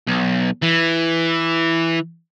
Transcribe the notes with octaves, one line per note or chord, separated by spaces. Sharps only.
B1
E3